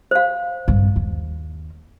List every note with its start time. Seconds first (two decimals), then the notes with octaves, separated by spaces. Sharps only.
0.11 C5 F5
0.68 G2 C3
0.96 D#2